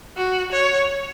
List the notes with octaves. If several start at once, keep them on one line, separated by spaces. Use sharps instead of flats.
F#4
C#5